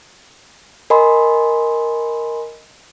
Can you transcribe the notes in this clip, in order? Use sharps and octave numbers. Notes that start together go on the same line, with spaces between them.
A#4 D#5 G#5 B5 C6